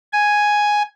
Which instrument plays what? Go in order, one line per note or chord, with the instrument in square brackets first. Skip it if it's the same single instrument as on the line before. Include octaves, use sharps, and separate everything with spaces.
[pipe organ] G#5